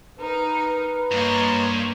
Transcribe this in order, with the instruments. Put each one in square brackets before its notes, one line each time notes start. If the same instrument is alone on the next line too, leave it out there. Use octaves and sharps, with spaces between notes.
[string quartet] D#4 [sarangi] A#4 [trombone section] B4
[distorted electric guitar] G2 [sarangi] A#3 [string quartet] C#5 D#5 C6